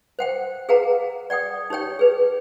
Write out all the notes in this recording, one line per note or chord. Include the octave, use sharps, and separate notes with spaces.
C5 F#5 G5
G#4 B4 F5 F#5 A#5
D5 F#5 G5 D#6
D#4 G4 C#5 G5
G#4 B4